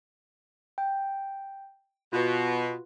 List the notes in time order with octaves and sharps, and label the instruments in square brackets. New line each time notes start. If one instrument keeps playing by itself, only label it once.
[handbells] G5
[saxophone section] B2 [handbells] F4 F#4 B4